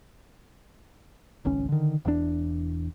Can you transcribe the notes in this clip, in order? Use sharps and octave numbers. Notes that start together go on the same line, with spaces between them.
D1 G#1 C#2 C#4
D3 D#3
E1 E2 C3 D4